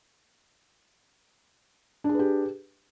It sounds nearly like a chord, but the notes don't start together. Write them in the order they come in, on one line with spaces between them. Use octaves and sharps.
D4 G#4 B4 G4